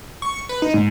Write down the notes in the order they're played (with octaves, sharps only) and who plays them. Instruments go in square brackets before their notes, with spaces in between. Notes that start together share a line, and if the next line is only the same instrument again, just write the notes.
[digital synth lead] C#6
B4
D#4
G#2